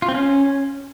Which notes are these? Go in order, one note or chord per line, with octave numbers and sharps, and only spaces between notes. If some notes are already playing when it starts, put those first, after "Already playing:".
F4
C4
C#4